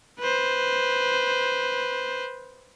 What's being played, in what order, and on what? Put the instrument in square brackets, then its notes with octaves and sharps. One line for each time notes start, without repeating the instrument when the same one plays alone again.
[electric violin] B4 C5